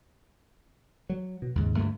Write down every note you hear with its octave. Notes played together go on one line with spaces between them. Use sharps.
F#3
B2
D#2 G#2 C#3
D2 G2 G#3 A3